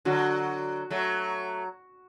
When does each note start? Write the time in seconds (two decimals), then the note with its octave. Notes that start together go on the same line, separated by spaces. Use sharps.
0.05 D3 F#3 F#4
0.90 F#3 A3